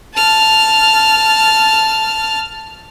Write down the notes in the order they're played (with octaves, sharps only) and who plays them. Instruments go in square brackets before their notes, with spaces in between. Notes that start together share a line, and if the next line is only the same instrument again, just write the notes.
[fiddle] A5 F6